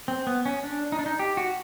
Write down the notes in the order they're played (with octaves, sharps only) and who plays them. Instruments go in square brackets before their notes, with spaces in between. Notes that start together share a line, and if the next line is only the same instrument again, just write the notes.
[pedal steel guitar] C4
B3
C#4
D4
D#4
D4
D#4
G4
F#4